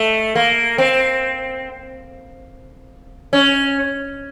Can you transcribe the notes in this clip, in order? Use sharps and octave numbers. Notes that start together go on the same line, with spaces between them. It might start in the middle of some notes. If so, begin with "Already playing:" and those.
Already playing: A3
A#3
C4
C#4